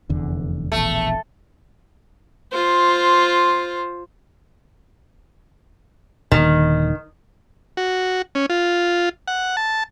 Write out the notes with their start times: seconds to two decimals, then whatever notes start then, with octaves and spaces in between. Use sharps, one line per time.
0.10 F1 E2 D3
0.72 E1 A#1 E2 A3
2.53 F4 C5
6.32 D#1 D#2 D3 D#3
7.77 F#4
8.35 C#4
8.50 F4
9.28 F#5
9.57 A5